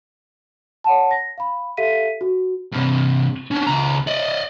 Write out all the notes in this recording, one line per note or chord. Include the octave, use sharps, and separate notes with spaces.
C#5 F#5 A5
A#6
F5 B5
G4 A4 E5 F5 B6 D#7
F#4
G2 C3
C#4 D4
C#2 A#5
D5 D#5